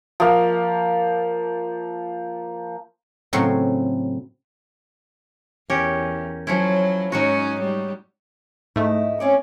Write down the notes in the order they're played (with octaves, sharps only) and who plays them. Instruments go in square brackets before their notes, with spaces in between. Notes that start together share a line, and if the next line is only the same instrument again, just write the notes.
[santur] F3 A#3
[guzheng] A2 C#3 F#3 C4
[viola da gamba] E2 [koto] C#4 G4 A#4
[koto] F3 C#4 E4 [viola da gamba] F#3
[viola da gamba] G#2 C#4 [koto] F#3 D#4 F#4
[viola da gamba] G3
[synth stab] G#2 A3 [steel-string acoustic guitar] E4 [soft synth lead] D#5
[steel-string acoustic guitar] C4 C#5 D5 [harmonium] C#4